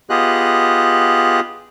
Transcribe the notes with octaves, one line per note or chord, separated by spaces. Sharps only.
B3 F4 G4 G#4 D#5 F#6